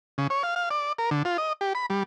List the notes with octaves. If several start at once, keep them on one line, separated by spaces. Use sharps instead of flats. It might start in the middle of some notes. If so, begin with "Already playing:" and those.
C#3
C#5
F5
F5
D5
A#4
D3
F4
D#5
G4
B5
G3